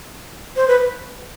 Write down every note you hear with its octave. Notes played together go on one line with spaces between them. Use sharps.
C5
B4